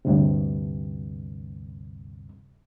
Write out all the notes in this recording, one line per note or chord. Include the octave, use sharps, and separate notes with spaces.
D2 G2 C3